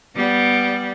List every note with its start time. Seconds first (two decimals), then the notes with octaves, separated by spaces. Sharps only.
0.15 G3 B3